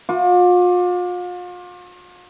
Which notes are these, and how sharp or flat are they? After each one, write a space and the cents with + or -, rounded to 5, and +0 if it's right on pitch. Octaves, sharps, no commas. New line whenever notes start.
F4 +40 D6 +0